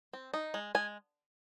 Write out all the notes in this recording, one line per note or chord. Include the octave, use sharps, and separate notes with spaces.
C4
D#4
G#3
G#3 G#5